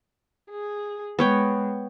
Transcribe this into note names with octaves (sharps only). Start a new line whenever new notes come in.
G#4
G#3 B3 C#5 G5